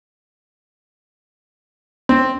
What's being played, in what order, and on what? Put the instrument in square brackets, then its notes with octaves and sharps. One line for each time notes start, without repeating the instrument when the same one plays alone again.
[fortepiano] C4